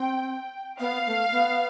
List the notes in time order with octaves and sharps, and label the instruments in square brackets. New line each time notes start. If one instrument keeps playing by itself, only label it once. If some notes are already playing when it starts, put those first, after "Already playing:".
Already playing: [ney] C4 [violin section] G5
[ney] B3 [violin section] F5
[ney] A3
B3